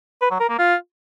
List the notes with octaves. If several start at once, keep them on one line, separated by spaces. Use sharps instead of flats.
B4
F#3
A#4
A#3
F4